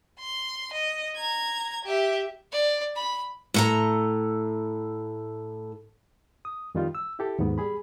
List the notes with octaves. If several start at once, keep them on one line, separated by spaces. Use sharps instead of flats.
C6
D#5
A#5 G#6
G4 E5
D5
B5
A2 A4 A#5
D#6
F2 D#3 G3 D#4 F4
E6
E4 G4 A4
D#2 G#2 F#3 B3
G3 G#4 B5